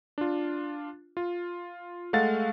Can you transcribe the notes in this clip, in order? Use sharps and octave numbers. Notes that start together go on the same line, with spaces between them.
D4 F4
F4
G#3 A3 A4 F5 F#5 A6